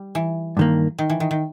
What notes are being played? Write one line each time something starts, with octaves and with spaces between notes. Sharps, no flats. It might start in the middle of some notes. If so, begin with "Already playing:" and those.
Already playing: G3
E3
G2 D#3 A#3
D#3
E3
D#3
D#3